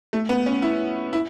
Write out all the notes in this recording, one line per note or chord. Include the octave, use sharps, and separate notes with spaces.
A3
B3
C#4
E4
E4